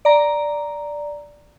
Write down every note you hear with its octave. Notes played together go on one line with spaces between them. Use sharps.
D5 A#5